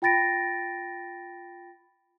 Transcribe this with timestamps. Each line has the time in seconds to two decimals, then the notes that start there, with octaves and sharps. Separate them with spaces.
0.02 F4 G5 B5 A6 A#6 D7